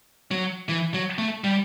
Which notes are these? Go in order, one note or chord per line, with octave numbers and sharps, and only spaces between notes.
F#3
E3
F#3
A3
G3